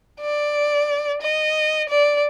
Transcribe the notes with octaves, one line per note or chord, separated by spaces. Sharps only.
D5
D#5
D5